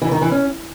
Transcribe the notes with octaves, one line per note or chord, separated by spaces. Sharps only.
E3
D#3
E3
C#4